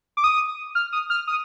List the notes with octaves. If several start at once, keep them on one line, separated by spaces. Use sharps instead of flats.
D6
D#6
F6
D#6
F6
D#6